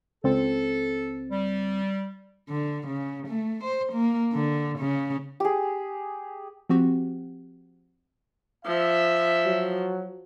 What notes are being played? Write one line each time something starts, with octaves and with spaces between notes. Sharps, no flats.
C#2 C4 A4
G3
D3
C#3
A3
C5
A#3
D3
C#3
G4 G#4
F3 C4 F#4 G4
F3 E5
F#3